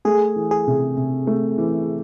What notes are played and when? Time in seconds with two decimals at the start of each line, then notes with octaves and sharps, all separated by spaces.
0.05 A3 G#4
0.36 E3
0.51 G#4
0.67 C3
0.97 C3
1.27 A3
1.58 E3